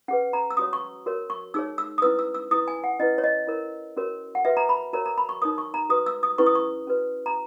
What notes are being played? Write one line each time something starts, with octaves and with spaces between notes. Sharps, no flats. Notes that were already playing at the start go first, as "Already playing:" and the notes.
C#4 G#4 B4 F#5
A#5
E6
C#4 F#4 C#5 D#6
C#6
F#4 A#4 C#5
C#6
D#4 G#4 C#5 E6
E6
D#6
C#4 E4 B4 E6
E6
E6
E4 B4 D#6
G#5
F#5
C#4 E4 B4 D#5
C#5
D#5
E4 A#4 C#5
C#4 F#4 A#4 C#5
F#5
F#4 B4 E5
A#5
B5
F#4 A#4 C#5 A#5
A#5
B5
C#6
D#4 A#4 C#5 D#6
C#6
A#5
F#4 B4 D#6
E6
D#6
C#4 E4 G#4 B4 C#6
D#6
C#6
C#4 F#4 B4
A#5